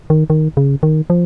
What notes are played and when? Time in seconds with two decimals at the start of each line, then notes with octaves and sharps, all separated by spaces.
0.10 D#3
0.30 D#3
0.57 C#3
0.83 D#3
1.10 F3